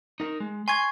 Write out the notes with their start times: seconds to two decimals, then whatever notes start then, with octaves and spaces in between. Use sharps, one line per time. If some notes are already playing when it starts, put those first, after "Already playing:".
0.20 D#4 A#4
0.40 G#3
0.68 G#5 C6 C#6 G#6